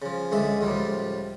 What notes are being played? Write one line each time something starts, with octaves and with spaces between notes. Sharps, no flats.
C#3 F3
C#2 D3 G#3 E5
C#2 A2 F3 G3